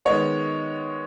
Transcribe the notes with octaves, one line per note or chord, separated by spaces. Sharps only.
D#3 G#3 B3 C#5